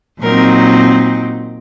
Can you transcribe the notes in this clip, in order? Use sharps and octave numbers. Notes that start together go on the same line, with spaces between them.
A#2 F#3 C4 D#4 A#4